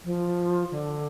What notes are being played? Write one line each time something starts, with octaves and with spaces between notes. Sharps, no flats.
F3
D3